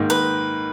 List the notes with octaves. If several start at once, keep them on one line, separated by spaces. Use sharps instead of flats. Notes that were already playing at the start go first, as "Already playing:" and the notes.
Already playing: G#2 D#3 A#3
B4